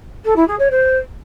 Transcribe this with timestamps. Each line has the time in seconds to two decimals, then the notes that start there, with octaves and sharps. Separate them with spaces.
0.24 A4
0.36 E4
0.47 G#4
0.59 C#5
0.70 C5